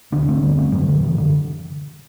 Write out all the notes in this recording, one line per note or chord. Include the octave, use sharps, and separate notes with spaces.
D2 D3 B3 D4
A3 C4
D2 D3 G3 B3
A3 C4
F#2 D3 F#3 A3
D3 F#3
F#2 D3 E3
D3